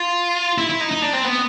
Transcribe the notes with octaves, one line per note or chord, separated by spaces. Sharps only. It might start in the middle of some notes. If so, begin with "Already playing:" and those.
Already playing: F4
E4
E4
D#4
D#4
D4
C4
B3